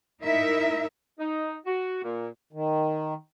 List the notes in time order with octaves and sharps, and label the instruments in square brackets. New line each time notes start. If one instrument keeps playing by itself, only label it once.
[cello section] D#4 E4 A#4 E5
[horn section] D#4
F#4
A#2
[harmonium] D#3